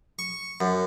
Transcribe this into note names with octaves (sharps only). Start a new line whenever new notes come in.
C#6
F#2